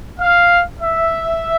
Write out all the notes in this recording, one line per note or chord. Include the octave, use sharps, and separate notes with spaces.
F5
E5